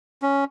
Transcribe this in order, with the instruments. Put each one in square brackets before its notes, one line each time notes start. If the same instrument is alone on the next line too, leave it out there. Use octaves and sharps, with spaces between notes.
[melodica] C#4